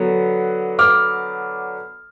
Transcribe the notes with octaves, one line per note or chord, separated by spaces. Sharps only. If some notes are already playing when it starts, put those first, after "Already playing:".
Already playing: D3 F#3 B3
D6 F6